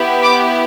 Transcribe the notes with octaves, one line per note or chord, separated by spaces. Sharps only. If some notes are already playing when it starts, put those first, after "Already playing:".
Already playing: B3 E4 G4
B5 D6